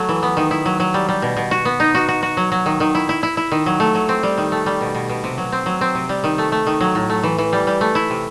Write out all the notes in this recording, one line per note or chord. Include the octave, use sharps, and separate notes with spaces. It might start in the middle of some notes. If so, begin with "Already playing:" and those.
Already playing: F#3 A3
E3
B3
D#3
E4
F#3
F#3
G3
G3
B2
B2
F#4
B3
D#4
F#4
F#4
F#4
F#3
F#3
D#3
D#3
E4
E4
E4
E4
D#3
F#3
A3
F#3
C4
G3
D#3
A3
G3
B2
B2
B2
C3
F#3
C4
F#3
C4
C3
G3
D#3
A3
A3
D#3
F#3
A2
A3
E3
E3
G3
G3
A3
E4
C3